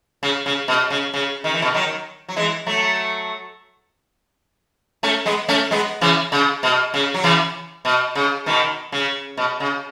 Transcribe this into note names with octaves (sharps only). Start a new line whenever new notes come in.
C#3
C#3
B2
C#3
C#3
D#3
E3
B2 D#3
D#3 F#3
F#3
E3 G#3
F#3 A3
A3 C#4
G#3 B3
A3 C#4
G#3 B3
C#3 E3
C#3
B2
C#3
F#3
C#3 E3
B2
C#3
B2 D#3
C#3
B2
C#3